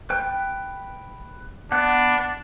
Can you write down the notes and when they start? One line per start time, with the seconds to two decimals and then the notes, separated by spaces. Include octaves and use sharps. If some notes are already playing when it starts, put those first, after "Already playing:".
0.10 B4 G5
1.72 B3 D4 F#5